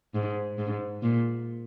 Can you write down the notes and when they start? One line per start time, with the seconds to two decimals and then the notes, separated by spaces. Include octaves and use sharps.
0.15 G#2
0.58 G#2
1.02 A#2